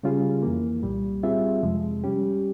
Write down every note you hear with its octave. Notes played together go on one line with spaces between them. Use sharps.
C#3 G3 C#4 F4 G#4
F2 E3 A#3
C2 A#2 G3
G3 C4 F4 G#4 E5
F2 C3 F3 G#3
G3 C#4 G4